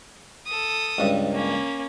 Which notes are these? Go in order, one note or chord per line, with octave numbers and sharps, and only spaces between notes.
A4 D#6
C#2 G2
A#3 C#4